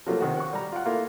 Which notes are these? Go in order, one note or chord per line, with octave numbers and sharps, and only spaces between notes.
F3 F#3 A3 A#3 C#4
C3 D#3 F#4
F#5 C#6
G3 A#5
F4 F#5
A3 A#3 E4 F4